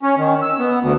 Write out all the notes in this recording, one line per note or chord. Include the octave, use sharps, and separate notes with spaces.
C#4
D#3
E6
B3
D2